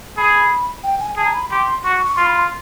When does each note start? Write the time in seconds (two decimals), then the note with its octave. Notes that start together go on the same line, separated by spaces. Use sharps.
0.17 G#4 B5
0.84 G5
1.00 G#5
1.17 G#4 A5
1.25 A#5
1.34 B5
1.51 G4 C6
1.84 F#4 C#6
1.96 C#6
2.06 C#6
2.16 F4 C6
2.26 B5
2.35 C6